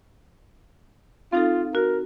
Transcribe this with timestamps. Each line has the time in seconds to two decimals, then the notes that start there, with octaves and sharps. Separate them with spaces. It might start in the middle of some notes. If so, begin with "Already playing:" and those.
1.32 C4 D#4 F4 A4
1.75 F#4 A#4